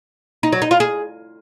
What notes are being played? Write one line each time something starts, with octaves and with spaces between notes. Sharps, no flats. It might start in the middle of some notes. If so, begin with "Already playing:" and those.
D#4
F#3
D#4
F4
G#4